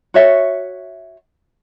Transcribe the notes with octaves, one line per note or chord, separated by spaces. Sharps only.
F#4 C#5 E5